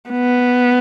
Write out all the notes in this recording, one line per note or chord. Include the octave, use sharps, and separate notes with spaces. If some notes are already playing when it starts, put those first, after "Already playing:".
B3